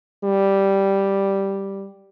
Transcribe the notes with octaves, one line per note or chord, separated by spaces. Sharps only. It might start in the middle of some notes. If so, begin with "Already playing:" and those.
G3